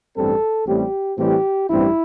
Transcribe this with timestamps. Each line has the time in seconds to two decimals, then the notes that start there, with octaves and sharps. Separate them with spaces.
0.15 A1 G2 G3 C4 A4
0.66 A1 A2 G3 C4 G4
1.17 A2 E3 G3 C4 G4
1.68 A1 G2 G3 C4 E4